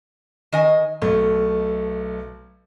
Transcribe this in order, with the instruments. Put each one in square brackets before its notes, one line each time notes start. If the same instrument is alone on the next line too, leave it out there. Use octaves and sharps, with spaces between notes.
[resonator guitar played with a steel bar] D#3 D#5 G#5
[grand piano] B1 A3 [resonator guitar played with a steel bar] B2